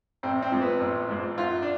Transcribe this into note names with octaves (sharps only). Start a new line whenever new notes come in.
A1 C4
C4
G#2 F3
B3
A1
G#2 F3
F#2 F4
D4